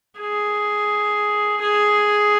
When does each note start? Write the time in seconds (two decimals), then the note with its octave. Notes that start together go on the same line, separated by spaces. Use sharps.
0.19 G#4
1.61 G#4